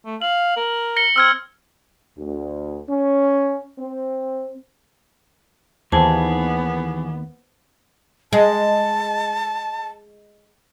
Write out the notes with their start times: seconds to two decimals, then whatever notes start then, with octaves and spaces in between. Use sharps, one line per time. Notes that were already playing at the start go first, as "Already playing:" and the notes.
0.05 A3
0.22 F5 F#7
0.57 A#4
0.96 A#6 C#7 G7
1.16 C4 E6 F6 G#6
2.18 D2
2.88 C#4
3.79 C4
5.92 D#2 E3 B3 G#4 C5 A5
8.33 G#3 A5